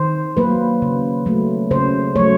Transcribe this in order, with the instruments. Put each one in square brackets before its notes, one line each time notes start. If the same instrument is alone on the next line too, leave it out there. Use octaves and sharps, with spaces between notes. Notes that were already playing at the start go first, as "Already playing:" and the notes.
Already playing: [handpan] D#3 C5
F#3 A#3 B4
C#3
F#3 A3
C#3 C5
F#3 A3 C#5